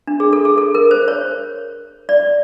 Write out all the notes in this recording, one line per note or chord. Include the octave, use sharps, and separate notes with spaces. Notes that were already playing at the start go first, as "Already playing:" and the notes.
D4
G#4
A4
G#4
A4
A#4
C5
C#5
D5